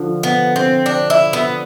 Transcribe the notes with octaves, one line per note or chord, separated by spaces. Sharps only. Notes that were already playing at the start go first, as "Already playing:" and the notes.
Already playing: D3 F3
B3
C4
D4
E4
B3